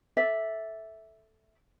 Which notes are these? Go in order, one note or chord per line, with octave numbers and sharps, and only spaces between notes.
A4 D5 E5